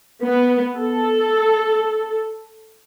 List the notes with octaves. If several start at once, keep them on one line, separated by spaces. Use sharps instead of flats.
B3
A4